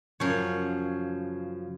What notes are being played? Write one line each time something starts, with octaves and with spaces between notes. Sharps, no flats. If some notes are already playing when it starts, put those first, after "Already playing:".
F#2 C#3 F3 C#5